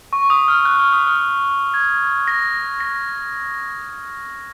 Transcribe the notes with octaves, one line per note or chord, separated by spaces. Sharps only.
C#6
D#6
F6
F#6
F6
D#6
F6
G#6
A#6
A#6